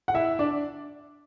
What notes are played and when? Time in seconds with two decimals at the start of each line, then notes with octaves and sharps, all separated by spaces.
0.08 F#5
0.14 E4 E5
0.39 D4 D5